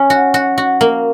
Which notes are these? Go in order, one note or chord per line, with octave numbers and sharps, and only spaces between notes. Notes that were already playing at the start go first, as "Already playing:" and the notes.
Already playing: C#4
F#4
F#4
F#4
A#3